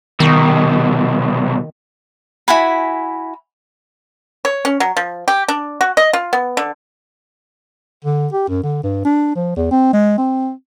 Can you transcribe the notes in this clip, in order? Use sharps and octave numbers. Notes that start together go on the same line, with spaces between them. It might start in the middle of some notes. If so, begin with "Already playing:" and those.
C2 B2 D#3
E4 F#4 G#5 B5
C#5
C#4
F#3
F3
G4
D4
F#4
D#5
F4
B3
D3
D3
G4
F#2
D3
G2
D4
F3
E2
C4
G#3
C4